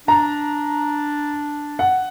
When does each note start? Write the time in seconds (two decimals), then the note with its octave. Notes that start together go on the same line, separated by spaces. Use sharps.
0.08 D4 A#5
1.79 F#5